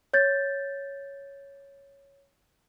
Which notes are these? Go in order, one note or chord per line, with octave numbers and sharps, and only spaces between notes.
C#5 G6 A6